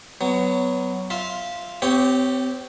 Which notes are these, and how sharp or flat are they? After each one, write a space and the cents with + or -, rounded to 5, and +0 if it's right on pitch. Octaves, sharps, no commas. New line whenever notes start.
F#3 +10 B3 +20
F4 +0 E5 -15
C4 -35 G4 +0 C#5 +0